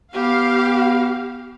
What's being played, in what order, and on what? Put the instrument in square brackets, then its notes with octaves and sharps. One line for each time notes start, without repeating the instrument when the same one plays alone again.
[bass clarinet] B3 [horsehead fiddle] G4 [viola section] F5